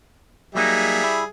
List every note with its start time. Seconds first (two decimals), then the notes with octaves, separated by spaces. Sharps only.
0.55 F#3 G3 A#3 D#4 G#4 E5
1.04 E4